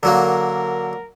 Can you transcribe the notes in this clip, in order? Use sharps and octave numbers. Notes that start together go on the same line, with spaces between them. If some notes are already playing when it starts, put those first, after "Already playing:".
D3 F#3 A#3 A#4